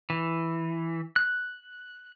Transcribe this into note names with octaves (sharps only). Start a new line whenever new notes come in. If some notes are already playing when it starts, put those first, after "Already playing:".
E3
F#6